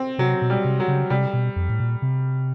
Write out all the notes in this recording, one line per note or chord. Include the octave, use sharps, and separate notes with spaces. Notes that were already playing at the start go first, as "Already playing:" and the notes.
Already playing: C4
C3 F#3
B2
G3
C3
F#3
C#3
C3 G3
B2
F2
A2
A#2
C3